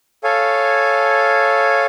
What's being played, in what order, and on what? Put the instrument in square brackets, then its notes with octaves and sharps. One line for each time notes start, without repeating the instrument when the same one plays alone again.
[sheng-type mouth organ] A4 C#5 F5 G#5